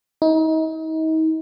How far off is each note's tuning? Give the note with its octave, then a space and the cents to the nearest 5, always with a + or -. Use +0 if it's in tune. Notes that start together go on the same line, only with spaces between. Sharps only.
D#4 +35